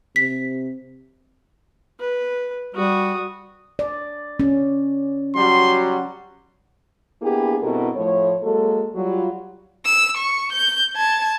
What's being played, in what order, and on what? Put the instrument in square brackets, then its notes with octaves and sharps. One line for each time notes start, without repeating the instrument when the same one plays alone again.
[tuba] C3 [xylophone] B6
[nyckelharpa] B4
[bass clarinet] G3 [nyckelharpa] F#4 D#6
[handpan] D5
C#4
[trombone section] F#3 G3 F#4 [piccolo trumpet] C6
[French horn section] A#3 B3 D4 E4 G4 G#4
G2 B2 C4 E4 A4 A#4
A2 F3 A3 C#5
F#3 G#3 A#3 A4
F#3 G3 F4
[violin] E6
C#6
G6
A5 G#6